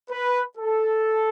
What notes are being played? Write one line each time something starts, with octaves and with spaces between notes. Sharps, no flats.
B4
A4